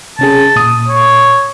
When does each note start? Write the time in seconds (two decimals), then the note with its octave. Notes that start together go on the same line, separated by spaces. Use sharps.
0.19 C3 C#4 G#4 A5
0.56 A#2 D#6
0.88 C#5